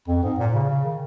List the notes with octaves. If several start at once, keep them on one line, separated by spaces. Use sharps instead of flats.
F2
G#2
A#2
C#3
C#3
D#3